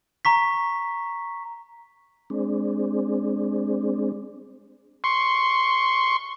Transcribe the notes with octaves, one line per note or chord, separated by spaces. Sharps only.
A#5 C#6 B6
G#3 C4 D4
C6 C#6